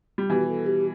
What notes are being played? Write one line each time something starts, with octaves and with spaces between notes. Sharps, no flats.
G3
B2 E3 G4
A4
G4